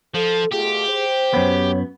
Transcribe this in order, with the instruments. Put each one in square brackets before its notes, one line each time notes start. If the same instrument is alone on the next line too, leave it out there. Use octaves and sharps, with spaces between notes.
[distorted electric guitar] F3 [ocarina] A4
[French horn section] B2 A3 F4 [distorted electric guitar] G4 [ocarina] G#4
[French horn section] C5
[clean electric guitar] F#2 B3 [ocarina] C#5